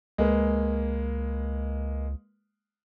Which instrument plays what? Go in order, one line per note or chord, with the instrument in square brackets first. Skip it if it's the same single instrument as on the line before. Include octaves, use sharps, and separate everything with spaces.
[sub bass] C#2 [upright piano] G#3 A#3 B4